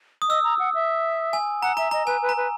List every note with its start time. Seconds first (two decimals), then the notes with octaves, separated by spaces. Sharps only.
0.22 D#6
0.29 D#5 E6
0.44 A#5
0.59 F#5
0.74 E5
1.33 G#5
1.62 F#5 A#5
1.77 E5 A#5
1.91 D#5 A#5
2.07 B4 G#5
2.22 B4
2.29 A#5
2.37 B4